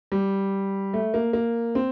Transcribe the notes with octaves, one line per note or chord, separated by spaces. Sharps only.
G3
A3
A#3
A#3
C4